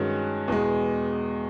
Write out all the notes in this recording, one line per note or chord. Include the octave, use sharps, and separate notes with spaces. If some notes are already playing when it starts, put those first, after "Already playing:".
Already playing: G2 D#3 G#3 C#4 F#4
E2 B2 G#3